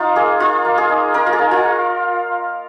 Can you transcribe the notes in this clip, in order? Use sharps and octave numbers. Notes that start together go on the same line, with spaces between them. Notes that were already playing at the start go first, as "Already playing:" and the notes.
Already playing: D#4 F4
A#3 G#4
D#4 F4
A#3
G#4
D#4
D#4 A#4
F4
G#4
D#4
F4